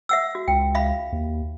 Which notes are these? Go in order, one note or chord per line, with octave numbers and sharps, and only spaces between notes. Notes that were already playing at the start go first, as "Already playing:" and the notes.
E5 F#5 E6
F#4
C#2 G5
E5 F5 B5
D#2